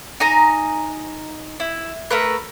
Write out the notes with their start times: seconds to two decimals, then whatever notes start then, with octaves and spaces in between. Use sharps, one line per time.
0.20 D#4 G#5 A#5
1.60 E4
2.11 A3 A#4 B4